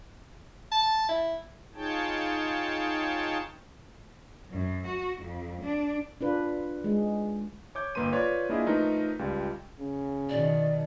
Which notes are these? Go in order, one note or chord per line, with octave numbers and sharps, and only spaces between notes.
A5
E4
D#4 F4 G#4 C#5 G5 A5
F#2
F#4
F2
D4
D4 F4 B4
G#3
C#5 D6 G6
G1 A#3 B4 C6 D#7
F4 B4 C#5 D5
A#3 D4 E4 F4 G#4 D#5
F3 A3 D#4 A#4 B4
C#2 G3 F4
C#3
B2 D#3 D5